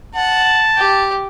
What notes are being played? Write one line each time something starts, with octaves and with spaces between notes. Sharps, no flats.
F#5 A5
G4